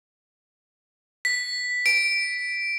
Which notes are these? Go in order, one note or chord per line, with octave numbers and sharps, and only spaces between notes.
B6
D7